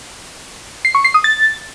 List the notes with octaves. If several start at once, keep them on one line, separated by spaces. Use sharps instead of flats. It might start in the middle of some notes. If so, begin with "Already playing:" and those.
C7
C#6
C7
D#6
A6